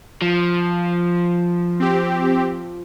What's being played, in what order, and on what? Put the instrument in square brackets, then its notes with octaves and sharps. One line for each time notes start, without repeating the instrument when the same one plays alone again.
[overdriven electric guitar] F3
[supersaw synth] C4 G4